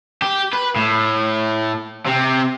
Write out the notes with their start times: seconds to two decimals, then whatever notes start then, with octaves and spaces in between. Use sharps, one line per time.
0.22 G4
0.53 B4
0.76 A2
2.06 C3 C4